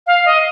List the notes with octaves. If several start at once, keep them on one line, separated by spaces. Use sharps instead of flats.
F5
D#5